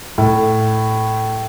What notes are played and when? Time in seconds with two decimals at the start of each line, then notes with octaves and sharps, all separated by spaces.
0.18 A2